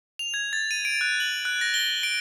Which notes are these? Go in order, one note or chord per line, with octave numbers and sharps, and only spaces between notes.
F7
G#6
A6
D#7
D7
F#6
F#7
F#6
A#6
G7
D7